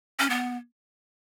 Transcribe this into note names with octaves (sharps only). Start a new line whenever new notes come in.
C#4
B3